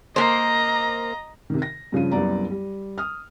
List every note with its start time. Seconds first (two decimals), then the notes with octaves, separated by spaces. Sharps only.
0.16 A#3 C5 D#5 A#5
1.50 C3 D#3
1.62 A#6
1.92 G2 C#3 F3 D#7
2.11 C2 F#2 G3 B3 D5 A#5
2.50 G3
2.98 D#6 F6